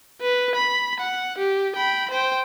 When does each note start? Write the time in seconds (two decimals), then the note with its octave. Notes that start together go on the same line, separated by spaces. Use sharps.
0.21 B4
0.55 B5
1.00 F#5
1.38 G4
1.76 G5 B5
2.11 C5 G5